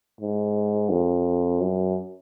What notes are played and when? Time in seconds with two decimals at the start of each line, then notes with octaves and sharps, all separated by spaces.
0.20 G#2
0.90 F2
1.61 F#2